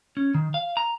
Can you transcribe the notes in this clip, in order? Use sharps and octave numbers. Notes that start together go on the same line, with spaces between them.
C#4
D#3
F5
A#5